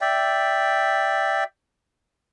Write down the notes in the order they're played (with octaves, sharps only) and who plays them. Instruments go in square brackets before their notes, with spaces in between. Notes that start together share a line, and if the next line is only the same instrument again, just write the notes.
[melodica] D5 E5 G5